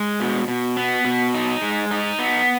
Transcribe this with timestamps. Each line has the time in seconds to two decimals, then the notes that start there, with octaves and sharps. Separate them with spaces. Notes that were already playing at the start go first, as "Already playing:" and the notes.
Already playing: G#3
0.20 B2
0.48 B2
0.77 B3
1.05 B2
1.34 D#4
1.62 G#3
1.91 D#4
2.19 B3